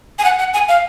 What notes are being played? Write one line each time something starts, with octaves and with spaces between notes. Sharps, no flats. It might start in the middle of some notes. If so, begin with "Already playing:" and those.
G#5
F#5
F#5
G#5
F5